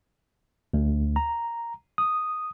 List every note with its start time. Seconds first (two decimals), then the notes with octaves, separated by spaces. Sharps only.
0.73 D2
1.16 A#5
1.98 D#6